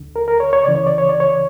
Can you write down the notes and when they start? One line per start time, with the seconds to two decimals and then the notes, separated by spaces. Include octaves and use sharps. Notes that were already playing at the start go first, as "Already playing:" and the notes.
Already playing: D2 D3
0.16 A#4
0.28 A#4
0.40 C#5
0.53 C#5
0.64 C#2 C#3 E3 D5
0.75 C#5
0.87 D5
0.98 C#5
1.09 D5
1.20 C#5